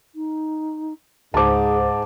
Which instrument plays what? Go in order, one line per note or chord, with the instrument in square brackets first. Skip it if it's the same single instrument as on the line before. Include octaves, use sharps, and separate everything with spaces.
[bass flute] D#4
[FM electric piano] C#2 C5 [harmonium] G#2 [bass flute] G#4 [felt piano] A5 D6